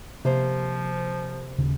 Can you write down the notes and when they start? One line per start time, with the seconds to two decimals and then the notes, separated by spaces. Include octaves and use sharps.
0.25 C3 F3 A#3 C5
1.58 D#1 C#3